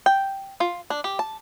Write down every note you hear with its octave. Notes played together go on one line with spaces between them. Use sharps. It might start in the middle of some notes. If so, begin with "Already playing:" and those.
G5
F4
D4
G4
A5